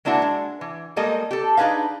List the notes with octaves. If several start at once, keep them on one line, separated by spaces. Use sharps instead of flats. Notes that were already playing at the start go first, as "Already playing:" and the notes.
G#3 A#3 D4 E4 F#4
G#3
E3
G3 G#3 A#3 A4 D#5
G4 A4
D4 D#4 G#4 B4 F5